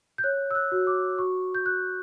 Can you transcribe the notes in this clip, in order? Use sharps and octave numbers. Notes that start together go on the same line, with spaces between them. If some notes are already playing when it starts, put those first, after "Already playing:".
G6
C#5 F#6
E6
F#6
F#4
D6
F#4 C#6
G6
F#4 F#6